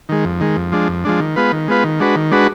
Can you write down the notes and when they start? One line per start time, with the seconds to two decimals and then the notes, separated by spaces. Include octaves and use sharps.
0.09 D#3 G#3
0.25 F2
0.40 D#3 G#3
0.56 F2
0.72 F3 G#3 D4
0.88 F2
1.04 F3 G#3 D4
1.20 D#3
1.36 G#3 B3 F4 B4
1.52 D#3
1.68 G#3 B3 F4 B4
1.84 D#3
2.00 G#3 D4 F#4 B4
2.16 D#3
2.31 G#3 D4 F#4 B4